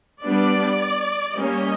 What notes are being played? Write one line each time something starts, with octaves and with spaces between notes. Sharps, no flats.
G3 B3 D4 D5
G3 A#3 C#4 D#5